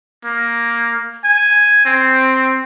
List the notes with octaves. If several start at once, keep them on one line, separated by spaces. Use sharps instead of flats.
A#3
G#5
C4